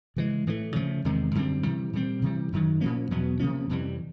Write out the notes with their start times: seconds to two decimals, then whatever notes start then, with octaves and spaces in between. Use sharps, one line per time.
0.16 C#3 E3 G#3
0.47 A2 E3 A3
0.75 C#3 F3 A3
1.05 E2 C3 D#3 G#3
1.35 F#2 D3 G3 C4
1.63 C3 E3 G3
1.93 A#2 G3 C4
2.22 C3 E3 G3
2.52 F#2 D#3 F#3
2.81 A#2 F3 A#3 C#4
3.10 E2 B2 F#3 B3
3.40 C3 F3 A#3 C#4
3.69 F2 C3 E3 G3